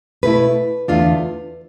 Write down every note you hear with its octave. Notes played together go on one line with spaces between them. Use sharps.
B2 A3 E4 B4
E2 D3 A3 D4 F4